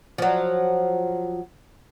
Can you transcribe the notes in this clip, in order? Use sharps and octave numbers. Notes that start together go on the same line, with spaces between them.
F3 F#3